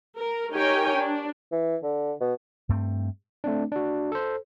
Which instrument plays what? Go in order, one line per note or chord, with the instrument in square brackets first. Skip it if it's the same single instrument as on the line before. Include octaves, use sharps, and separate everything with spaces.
[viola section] A#4
D#4 G4 A#4 C#5 G5 G#5
D4
[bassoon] E3
D3
B2
[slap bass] G2 A3 C4
[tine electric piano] A3 C4 D4
D4 F#4
A4 C5